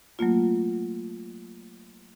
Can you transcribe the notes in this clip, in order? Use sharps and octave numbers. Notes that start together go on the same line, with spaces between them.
F#3 A3 A#3 F4